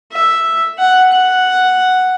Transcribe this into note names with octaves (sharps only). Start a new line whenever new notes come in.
E5
F#5
F#5